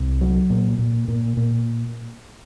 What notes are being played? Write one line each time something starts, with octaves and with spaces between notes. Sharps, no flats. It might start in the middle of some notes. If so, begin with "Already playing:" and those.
Already playing: C2
F#3
A#2
A#2
A#2
A#2